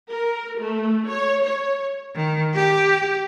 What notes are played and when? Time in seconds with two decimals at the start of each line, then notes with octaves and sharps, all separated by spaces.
0.11 A#4
0.59 A3
1.07 C#5
1.43 C#5
2.15 D#3
2.55 G4